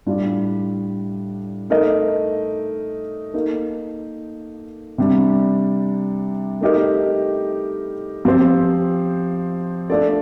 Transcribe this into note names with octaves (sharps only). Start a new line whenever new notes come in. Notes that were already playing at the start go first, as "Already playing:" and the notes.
A2 G3 D4 F4
A3 D#4 A#4 D#5
A#3 D#4 A4
C3 G3 D4
A3 D#4 G4 A#4 D#5
F3 C4 G4 C5
A3 D4 F4 A4 D5